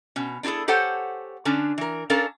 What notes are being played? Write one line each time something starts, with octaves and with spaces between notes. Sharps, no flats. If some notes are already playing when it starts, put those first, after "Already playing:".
B2 C#4
D4 E4 F#4 G#4 A4
G4 A4 C5 C#5 F#5 G#5
D3 C#4 D4
E3 A#4
C#4 D4 A4 A#4 D5 F5